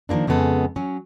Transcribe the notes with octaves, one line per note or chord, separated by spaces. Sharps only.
D#3 F3 G3 A#3 D4
F2 C#3 G#3 B3 A4
F#3 C#4